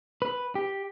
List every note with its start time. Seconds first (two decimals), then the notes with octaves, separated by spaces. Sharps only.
0.22 B4
0.55 G4